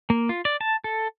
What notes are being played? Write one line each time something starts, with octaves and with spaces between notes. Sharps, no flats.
A#3
F4
D5
A5
A4